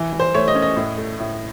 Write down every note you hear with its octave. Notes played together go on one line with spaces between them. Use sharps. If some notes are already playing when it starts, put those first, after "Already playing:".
Already playing: E3
E3
C5
A3 C#5
D#5
C#4
D#5
A2
A3
A2